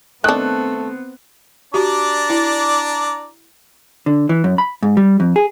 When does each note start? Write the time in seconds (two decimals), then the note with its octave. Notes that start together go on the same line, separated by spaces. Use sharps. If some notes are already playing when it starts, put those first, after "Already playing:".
0.24 D#3 A3 B3 C4 D4 F#6
1.74 D4 F#4 G4 D5 A#5
2.30 E4
4.06 D3
4.29 E3
4.44 F#2
4.58 B5
4.83 G#2
4.97 G3
5.20 F2
5.36 G#4